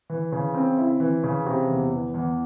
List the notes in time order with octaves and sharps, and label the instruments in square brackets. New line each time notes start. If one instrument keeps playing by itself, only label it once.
[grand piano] E3
C#3
C4
E4
E3
C#3
C3
E2
E3
E2